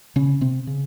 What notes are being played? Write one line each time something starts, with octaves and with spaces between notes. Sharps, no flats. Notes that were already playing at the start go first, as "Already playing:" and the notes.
C#3 C#4
C3 C4
C#3